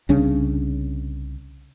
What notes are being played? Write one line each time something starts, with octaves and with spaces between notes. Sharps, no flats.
C2 C#3 C#4 D4